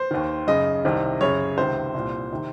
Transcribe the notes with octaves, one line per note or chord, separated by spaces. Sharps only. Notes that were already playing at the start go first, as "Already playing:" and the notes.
Already playing: C5
D#2 D#3
F#2 C#3 D#5
C2 C3 D#3
F#2 C#3 C#5
C#2 C3 D#3 C5
C2 A#2
C3 D#3